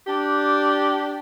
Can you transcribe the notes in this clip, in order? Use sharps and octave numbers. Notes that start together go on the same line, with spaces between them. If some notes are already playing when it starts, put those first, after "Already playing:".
D4 G4